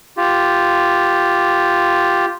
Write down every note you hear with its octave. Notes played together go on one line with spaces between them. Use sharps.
F4 G4